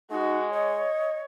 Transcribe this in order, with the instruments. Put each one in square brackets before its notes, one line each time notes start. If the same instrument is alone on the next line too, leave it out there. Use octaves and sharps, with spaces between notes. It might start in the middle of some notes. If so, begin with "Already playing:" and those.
[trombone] G#3 [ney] D#4 [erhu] F#4
[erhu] C#5 [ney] D#5